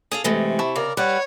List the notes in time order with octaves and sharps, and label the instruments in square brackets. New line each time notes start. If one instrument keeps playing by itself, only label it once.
[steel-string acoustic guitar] G#4 A4 F5 [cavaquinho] D#6
[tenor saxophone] C3 [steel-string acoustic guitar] E3 G#3 A3
[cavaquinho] E4 A5 C#6
[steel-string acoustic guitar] C#3 [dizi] A#4 [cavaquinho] D5
[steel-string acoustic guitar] G3 [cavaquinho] B4 F#5 [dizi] C#5